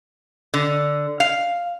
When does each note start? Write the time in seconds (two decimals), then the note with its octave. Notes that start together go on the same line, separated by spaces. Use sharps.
0.54 D3
1.20 F5